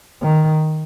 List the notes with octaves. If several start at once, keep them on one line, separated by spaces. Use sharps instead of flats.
D#3